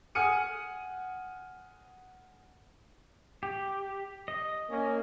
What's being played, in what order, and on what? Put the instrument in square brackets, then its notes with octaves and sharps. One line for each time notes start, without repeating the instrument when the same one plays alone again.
[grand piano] F#5 G#5 D#6 F6 C#7 D#7
[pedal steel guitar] G4
D#5
[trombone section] A#3 C#4